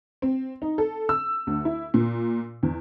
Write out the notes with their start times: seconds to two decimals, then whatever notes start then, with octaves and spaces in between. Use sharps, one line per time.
0.22 C4
0.62 D#4
0.78 A4
1.09 E6
1.47 D2
1.65 E4
1.94 A#2
2.63 E2